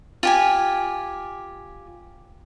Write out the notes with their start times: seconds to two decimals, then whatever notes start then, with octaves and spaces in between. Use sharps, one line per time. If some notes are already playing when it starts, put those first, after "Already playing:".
0.23 F4 G4 G#5